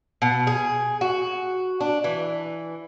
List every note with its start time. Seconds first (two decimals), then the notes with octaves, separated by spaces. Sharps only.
0.22 B2
0.47 G#4
1.01 F#4
1.81 D4
2.04 E3